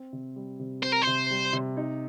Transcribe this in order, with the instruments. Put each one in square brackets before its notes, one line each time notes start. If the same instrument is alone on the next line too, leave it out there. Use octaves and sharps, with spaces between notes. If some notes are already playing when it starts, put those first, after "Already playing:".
Already playing: [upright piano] C4
C3
G3
C3
[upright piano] C4 [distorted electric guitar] C5
[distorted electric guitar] A#4
[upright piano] C3 [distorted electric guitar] C5
[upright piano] G3
C3
D#4